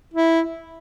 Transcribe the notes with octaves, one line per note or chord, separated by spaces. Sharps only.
E4